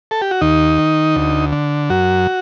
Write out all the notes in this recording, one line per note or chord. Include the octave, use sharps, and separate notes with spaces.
A4
G4
F#4
D#2 D#4
D#3
D2
D3
F#2 F#4